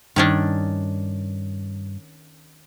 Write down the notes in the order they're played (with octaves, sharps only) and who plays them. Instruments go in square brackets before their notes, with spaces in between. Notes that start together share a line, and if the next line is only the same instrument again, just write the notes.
[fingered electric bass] G2 [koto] D#3 C#4 D4